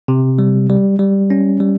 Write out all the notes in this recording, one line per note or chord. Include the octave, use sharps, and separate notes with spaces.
C3
G3
G3
G3
C#4
G3